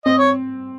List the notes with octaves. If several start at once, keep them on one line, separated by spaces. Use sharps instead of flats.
C4 D#5
C#5